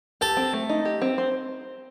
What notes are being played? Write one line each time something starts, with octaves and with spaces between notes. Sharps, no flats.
G4 A4
C4
A3
D#4
G4
C4
C5